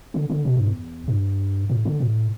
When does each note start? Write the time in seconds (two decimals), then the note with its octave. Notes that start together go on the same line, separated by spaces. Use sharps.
0.14 D3
0.30 D3
0.45 B2
0.56 G2
0.66 E2
1.08 G2
1.70 A2
1.85 D3
2.00 A2